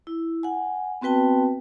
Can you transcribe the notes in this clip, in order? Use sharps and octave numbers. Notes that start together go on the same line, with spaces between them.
E4
F#5 G#5
B3 C4 F#4 B4 G5 A5